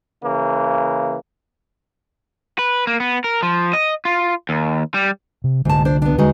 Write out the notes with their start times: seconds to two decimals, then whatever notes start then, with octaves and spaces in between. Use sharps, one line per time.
0.22 C#3 E3 A#3
2.59 B4
2.87 A#3
3.00 B3
3.24 A#4
3.43 F3
3.73 D#5
4.05 F4
4.49 D#2
4.94 G3
5.44 C3
5.65 C2 G#2 D3 A5
5.85 D4 C5
6.02 B3 D4
6.18 D#2 D3 G#3 D#4 F#4